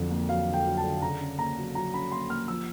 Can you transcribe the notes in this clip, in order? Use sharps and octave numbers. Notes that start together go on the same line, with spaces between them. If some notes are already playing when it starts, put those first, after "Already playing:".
Already playing: F2 D3 F#3
A#3
F#3 F5
D3
G5
F#3
A5
D3
C#3 A#5
C#4
A#3 A#5
F#3
F#3 A#5
C#4 B5
A#3 C6
A#3 F6
F3 E6